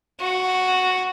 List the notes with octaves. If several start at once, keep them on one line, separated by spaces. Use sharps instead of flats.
F#4